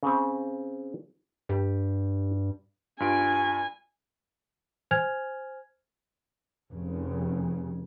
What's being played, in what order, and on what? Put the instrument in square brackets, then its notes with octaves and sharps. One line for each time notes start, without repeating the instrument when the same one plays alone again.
[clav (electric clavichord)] C#3 C4
[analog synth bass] G2 [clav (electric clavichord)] G4
[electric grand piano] G2 F4 D7 [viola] G#5
[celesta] C5 G#5 F6 G#6 F7
[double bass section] F1 C#3